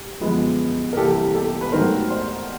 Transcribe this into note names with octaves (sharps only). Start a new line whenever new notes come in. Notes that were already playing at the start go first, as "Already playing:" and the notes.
Already playing: G4
F#2 D3 F3 G#3 B3
A#4
C2 C3 E3 G3 A#3 G4 A4
G4 A4
B4
G#2 D#3 F#3 A3 A#4 C5
C5 D5